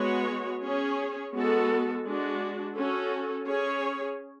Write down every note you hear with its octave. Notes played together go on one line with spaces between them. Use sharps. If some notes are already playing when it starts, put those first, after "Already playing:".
Already playing: G#3 B3 F#4 C#5
C#4 G#4 C#5
G#3 B3 F#4 A4
G#3 D4 F#4
C#4 F#4 A4
C#4 G#4 C#5